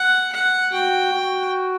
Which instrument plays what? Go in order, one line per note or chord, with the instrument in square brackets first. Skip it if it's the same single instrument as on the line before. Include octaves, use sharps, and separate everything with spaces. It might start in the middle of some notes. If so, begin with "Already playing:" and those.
Already playing: [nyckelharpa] F#5
F#5
[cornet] F#4 [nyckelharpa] G5
[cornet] F#4